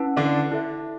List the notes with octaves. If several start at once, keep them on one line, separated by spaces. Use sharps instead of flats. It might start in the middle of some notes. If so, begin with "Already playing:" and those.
Already playing: C#4 E4 B4 F#5 A5
D3 D4
E4 A4 E5